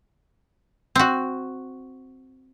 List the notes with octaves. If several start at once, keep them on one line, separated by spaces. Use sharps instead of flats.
C4 F#4